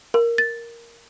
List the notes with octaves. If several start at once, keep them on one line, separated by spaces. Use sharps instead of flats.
A#4
A6